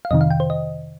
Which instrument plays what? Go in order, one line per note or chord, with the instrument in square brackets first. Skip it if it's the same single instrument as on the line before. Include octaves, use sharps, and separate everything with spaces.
[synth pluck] F5
F2 C3 D#3 D#5
F5
G5
C5
D#5